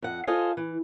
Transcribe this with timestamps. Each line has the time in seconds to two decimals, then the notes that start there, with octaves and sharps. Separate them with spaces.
0.02 F2 F#5
0.27 F4 A4 C5 D#5 F5 G#5
0.57 E3